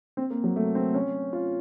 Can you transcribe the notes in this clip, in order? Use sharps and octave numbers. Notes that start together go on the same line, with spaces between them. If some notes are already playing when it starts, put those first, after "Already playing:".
C4
A#3
F#3
A3
C4
C#4
F4